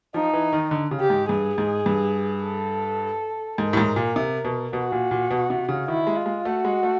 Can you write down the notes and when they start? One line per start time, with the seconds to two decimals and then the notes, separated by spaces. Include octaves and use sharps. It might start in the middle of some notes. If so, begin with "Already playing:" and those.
0.14 F3 D#4
0.34 E3
0.53 D#3
0.71 D3
0.91 C#3
1.00 G4
1.10 G#2
1.29 G2 G#4
1.58 G#2
1.86 G2
2.44 A4
3.58 G#2 A#4
3.73 A2
3.77 G#2
3.96 A#2
4.16 C3
4.45 B2
4.73 B2 F#4
4.92 A#2
5.11 A#2
5.31 B2
5.50 C3
5.69 C#3
5.88 D#3 E4
6.07 G#3
6.17 F4
6.26 G#3
6.45 A3 F#4
6.65 G#3
6.83 A3